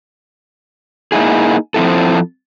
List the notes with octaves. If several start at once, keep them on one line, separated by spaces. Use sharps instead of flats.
A#3 D#4 E4 G#4
F3 C4 E4 A4